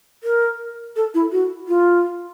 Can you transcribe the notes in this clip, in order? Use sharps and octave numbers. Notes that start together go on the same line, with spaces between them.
A#4
A4
E4
F#4
F4